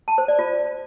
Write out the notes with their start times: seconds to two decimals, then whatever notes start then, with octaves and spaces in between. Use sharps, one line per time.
0.08 A5
0.18 C5
0.28 D5
0.39 F4